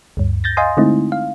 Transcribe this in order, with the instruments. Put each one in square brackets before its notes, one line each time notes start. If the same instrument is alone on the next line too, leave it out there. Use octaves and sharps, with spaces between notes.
[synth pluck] D2 G2
G6 A6 A#6
D#5 F5 G#5 C6 D#6
D3 G#3 A3 C4 D#4 E4
F5